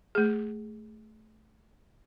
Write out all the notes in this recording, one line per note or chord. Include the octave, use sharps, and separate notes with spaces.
A3 G#4